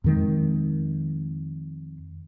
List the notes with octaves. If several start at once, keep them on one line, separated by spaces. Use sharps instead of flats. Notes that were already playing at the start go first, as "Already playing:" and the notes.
F2 D#3 G#3